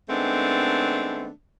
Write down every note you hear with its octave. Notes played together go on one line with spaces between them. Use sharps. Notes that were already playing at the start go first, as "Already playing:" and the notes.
D#3 G#3 A3 B3 C4 D4